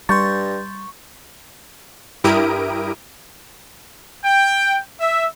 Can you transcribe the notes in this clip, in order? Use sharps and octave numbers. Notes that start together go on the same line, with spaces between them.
G2 G3 C6 C#6 G6 A6
G2 E4 G4 A#4 D#6 D7
G5
E5